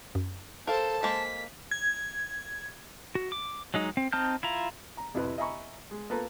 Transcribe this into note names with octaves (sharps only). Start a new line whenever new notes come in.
F#2
A4 A#4 C5 F5 A5
G#3 A#3 C5 B6
G#6
F#4
D6
F#3 G#3 D#4
C4
C4 D#4 A5 F6 G6
E4 F4 A#5
A#5
F2 C3 E4 B4
D#5 E5 G#5 A#5 B5 C#6
G#3
A#3 F4 A4 B4 A#5